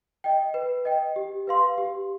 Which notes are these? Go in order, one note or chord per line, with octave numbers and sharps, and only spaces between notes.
D#5 G5
B4
D#5 G5
G4
B4 F5 C6
G4